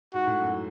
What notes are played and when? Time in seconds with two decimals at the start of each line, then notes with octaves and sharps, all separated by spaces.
0.14 G#2 F#4
0.27 A2
0.42 F#2